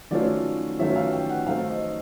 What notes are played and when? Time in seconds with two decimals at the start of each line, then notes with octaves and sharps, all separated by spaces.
0.11 D#3 F#3 A3 C#4 F4 D5
0.79 D#3 F#3 A3 C#4 F4 E5
0.96 F5
1.12 G5
1.29 F#5
1.47 D#3 F#3 A3 C4 F5
1.70 D#5